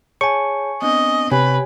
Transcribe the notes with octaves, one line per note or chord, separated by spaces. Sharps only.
G#4 C#5 G#5 A5 C#6
B3 C4 D4 D#5
C3 G4 B4 C#5 G#5